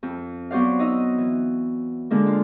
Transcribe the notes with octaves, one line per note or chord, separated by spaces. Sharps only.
F2
F#3 B3 F#4 C5 D5 F5
D#4 D#5 E6
E3
D3 G#3 A#3 D4
F4